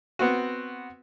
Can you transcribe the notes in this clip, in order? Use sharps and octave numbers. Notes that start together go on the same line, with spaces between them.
B3 C4 F#4